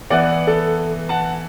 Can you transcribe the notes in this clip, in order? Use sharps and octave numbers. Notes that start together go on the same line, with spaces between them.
E3 B3 E4 D5 F#5
A4
F#5 A5